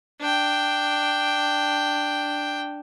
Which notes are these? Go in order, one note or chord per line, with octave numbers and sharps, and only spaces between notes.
D4 G5